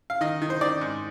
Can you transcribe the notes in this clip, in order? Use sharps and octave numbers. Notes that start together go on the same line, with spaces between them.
F5
D#3 D#5
D#3
C5
D#3 D5
G#2